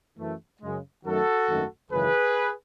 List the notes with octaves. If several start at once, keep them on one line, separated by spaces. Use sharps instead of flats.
F#2 E3 A3
F#2 C#3 G#3
F#2 D#3 F#3 A3 F#4 A4
G#1 F#2 D#3 A3
G#1 F#2 C#3 E3 G#4 B4